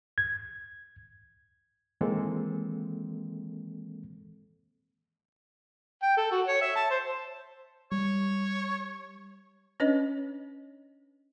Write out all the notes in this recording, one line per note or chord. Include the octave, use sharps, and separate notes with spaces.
G#6
D#3 E3 G#3 A#3 C4 A4
G5
A4
F#4
C#5
E5
A5
C5
G3 C#5
C#4 D4 B4 C#5 D#5